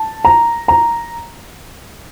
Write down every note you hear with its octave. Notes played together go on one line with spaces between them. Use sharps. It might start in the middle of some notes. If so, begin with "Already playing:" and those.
Already playing: A5
A#5
A#5